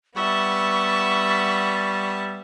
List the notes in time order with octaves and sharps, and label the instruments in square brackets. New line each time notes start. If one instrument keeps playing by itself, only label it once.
[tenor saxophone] G3 [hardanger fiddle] B3 A5 [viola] E5 F#5 [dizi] C#6